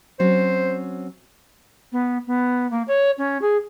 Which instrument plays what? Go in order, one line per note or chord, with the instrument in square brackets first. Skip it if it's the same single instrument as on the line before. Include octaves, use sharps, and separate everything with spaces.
[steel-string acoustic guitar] F#3 C4 C#4 [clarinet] C5
[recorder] B3
B3
A#3
C#5
C#4
G#4